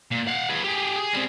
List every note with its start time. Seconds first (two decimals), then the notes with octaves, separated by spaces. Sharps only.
0.11 A#2
0.27 F5 F#5
0.49 G#4 B4
0.64 G4 G#4
0.97 G#4
1.14 G3 C4